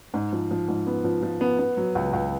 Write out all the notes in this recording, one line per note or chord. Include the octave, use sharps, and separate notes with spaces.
G#2
F3
F3
G#2
B3
F3
F3
B3
B3
F#3
C#2
C#2